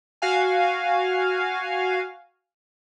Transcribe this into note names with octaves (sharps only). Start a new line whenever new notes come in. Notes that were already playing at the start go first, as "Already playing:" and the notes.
F#4 F5 G#5